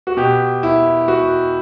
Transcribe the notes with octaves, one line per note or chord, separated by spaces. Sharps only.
F#4
B2 G4
E4
F#4